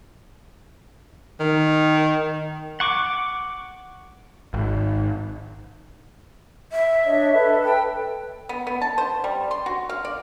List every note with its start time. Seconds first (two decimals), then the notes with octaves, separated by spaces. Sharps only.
1.40 D#3
2.80 F#5 C#6 D6
4.54 G#1
6.72 E5
7.04 D4 C#5 D#5
7.33 A4 B4
7.64 G5
8.49 B3
8.67 B3
8.82 A5
8.98 C5
9.24 G3
9.51 C6
9.66 F#4
9.90 F5
10.05 D5